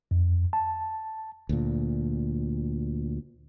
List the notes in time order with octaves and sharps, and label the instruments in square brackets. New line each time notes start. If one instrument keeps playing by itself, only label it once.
[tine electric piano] F2
A5
[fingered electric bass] D2 A#2